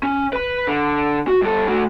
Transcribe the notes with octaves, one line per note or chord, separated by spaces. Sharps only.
C#4
B4 B5
D3
F#4
G2 A4
A3 F#4